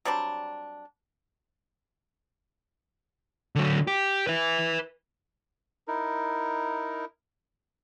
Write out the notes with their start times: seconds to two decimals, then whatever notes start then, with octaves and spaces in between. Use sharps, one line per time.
0.05 F#3 G3 C4 D4
3.55 D3 F#3
3.87 G4
4.27 B4 E5
5.88 D#4 E4 A#4